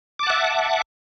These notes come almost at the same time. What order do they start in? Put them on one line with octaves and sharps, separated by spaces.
D6 A5 F#5 E5